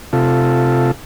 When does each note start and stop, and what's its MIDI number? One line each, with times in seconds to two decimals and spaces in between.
0.13 0.91 48
0.13 0.91 65
0.13 0.91 69